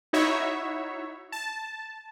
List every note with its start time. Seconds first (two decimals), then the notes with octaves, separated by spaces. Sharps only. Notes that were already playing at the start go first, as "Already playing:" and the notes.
0.13 D#4 E4 F#4 C#5 E5
1.32 A5